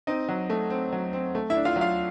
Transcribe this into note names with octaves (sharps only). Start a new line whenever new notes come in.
C4 D#4 D#5
F#3
A3
C4
F#3
C4
A3
E4 E5
D4
F4 F5
F#3
F4 F5